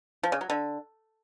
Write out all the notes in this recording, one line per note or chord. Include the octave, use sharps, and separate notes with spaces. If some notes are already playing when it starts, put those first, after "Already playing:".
F3
C#3
F#3
D3